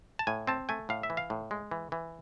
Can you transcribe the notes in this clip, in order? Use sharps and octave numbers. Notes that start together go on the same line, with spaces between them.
A5
A2 G#5
C4 A5
A3 G#5
A2 F5
E5
E3
F5
A2
G#3
E3
E3